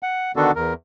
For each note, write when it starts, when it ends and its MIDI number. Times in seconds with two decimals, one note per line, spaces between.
0.03 0.32 78
0.36 0.51 50
0.36 0.51 51
0.36 0.51 59
0.36 0.51 62
0.36 0.51 66
0.36 0.51 69
0.56 0.73 40
0.56 0.73 70